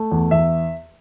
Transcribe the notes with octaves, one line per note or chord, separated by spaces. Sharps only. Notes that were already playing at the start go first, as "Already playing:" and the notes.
Already playing: A3
E2
E2 E5